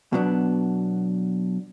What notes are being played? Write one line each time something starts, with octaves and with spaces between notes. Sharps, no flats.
B2 F#3 B3 D4